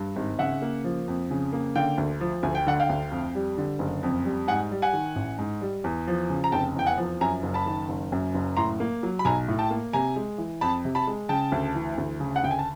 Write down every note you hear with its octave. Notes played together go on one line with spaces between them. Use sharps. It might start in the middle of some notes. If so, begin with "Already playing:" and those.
Already playing: G2
G#1
C#3 E5 F#5
A#3
F3
F2
C#3
A#3
D3 F5 G5
D2
F3
D2 G#5
G5
D3 F#5
F5 G5
D2
F2
G3
D3
F#1
F2
G3
G#2 F#5 G#5
G3
F#5 G#5
D#3
A1
G#2
G3
E2
F3
C#3
A#5
F1 G5 A5
E2 G5
F#5 G#5
F3
F#2 G#5 A#5
F#1
A5 B5
D#3
F#1
F#2
F#1
A2 A#5 C6
A#3
F#3
B5
B1 G#5 A#5
A2
G5 A5
A#3
C3 G#5 A#5
G#3
E3
F2 A5 B5
C3
A5 B5
G#3
C#3 G5 A5
D2
E3
D2
C#3
F#5
D2 G5
G#5
A5